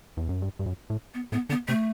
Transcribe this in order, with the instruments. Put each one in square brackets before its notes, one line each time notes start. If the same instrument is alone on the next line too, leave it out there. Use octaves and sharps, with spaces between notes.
[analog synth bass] E2
F#2
G2
G2
F#2
A2
[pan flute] B3
[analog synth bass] A2 [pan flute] B3
[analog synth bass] D3 [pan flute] B3
[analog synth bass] C3 [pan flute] A3